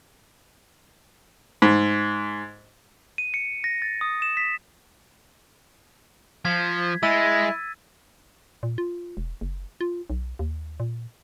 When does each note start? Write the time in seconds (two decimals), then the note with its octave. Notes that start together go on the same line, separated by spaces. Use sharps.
1.62 G#2
3.18 D#7
3.34 C#7
3.64 A#6
3.82 A6
4.01 D#6
4.22 E7
4.37 B6
6.45 F3 G#6 B6
7.03 G#3 E4 E6 A6 D#7
8.63 A#2
8.78 F4
9.17 E1
9.41 F#1
9.81 F4
10.10 B1
10.39 D#2
10.80 A#2